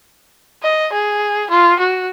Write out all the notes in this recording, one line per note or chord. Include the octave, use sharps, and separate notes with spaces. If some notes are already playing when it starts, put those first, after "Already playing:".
D#5
G#4
F4
F#4